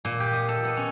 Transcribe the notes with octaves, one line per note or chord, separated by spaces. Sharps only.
A#2
G4
D#5
A4
B3
C#4